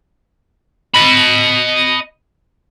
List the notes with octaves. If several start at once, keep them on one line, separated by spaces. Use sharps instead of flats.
D#5 B5